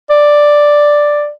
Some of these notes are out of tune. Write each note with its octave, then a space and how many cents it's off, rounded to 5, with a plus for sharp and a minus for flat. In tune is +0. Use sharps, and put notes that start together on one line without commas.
D5 +5